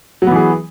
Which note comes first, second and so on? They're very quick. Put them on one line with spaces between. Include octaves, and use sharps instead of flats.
F#3 B3 E3 G#4